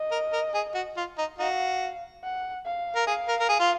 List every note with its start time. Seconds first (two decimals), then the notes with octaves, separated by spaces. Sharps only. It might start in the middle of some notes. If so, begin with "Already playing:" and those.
Already playing: D#5
0.11 A#4
0.33 A#4
0.54 G#4
0.75 F#4
0.97 F4
1.18 D#4
1.38 D#4 F#4 F5
2.23 F#5
2.65 F5
2.96 A#4
3.07 G#4 F5
3.28 A#4
3.40 A#4
3.49 G#4
3.60 F4